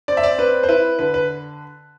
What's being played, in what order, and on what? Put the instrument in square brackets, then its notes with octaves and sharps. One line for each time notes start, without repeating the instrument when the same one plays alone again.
[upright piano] C4 D5
E5
D5
C4 B4
C5
E4 B4
D3 B4
B4